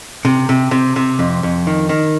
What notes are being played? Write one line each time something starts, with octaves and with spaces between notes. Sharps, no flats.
C3
C3
C3
C3
F2
F2
D#3
D#3